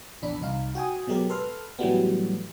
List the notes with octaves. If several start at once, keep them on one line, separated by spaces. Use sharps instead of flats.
A#1 E2 D4 B5
C2 D#4 F5
F#4 G5 G#5 D#6
B2 F#3 G#3 G4 A#4
A4 B4 C6 F6
A2 E3 F#3 G3 A3 B3